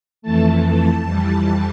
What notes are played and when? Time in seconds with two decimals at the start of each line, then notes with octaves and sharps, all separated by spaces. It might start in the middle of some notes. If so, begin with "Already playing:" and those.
0.22 F2 E3 A3 A5
0.63 A5
1.03 F2 E3 G3